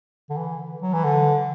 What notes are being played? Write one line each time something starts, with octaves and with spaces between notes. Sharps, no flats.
D3
E3
F#3
E3
D3